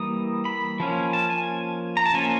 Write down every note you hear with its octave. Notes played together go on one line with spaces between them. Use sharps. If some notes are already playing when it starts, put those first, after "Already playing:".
Already playing: E3 G3 A#3 D#6
B5
F3 A#3 C#4
A5
G#5
A#5
A5
F3 A#3 C#4 G#5